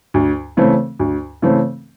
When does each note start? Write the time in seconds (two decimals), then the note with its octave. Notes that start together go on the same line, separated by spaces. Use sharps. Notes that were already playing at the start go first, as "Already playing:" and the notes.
0.14 D2
0.57 C#3 E3 A3 C4
0.99 D2
1.42 C#3 E3 A3 C4